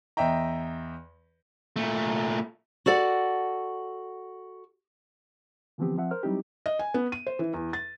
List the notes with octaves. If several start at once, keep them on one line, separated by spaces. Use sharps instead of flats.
E2 D#5 E5 G5 A#5
A#2 A3
F#4 A4 D5 F#5
D3 E3 F3 B3 C4 G4
F3 C4 E5 F#5
A#4 C5 F6
F#3 G3 C4 D#4 E4 G4
D#5
G#5
B3
D#7
C5
E3
E2
A6